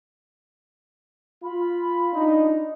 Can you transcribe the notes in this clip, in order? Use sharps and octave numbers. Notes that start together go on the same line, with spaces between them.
F4 B5
D4 D#4